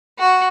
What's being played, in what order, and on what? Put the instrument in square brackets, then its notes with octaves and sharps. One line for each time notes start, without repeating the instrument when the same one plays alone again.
[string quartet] F#4